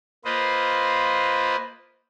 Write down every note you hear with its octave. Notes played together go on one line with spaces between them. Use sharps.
A#3 F4 B4 C5 D#5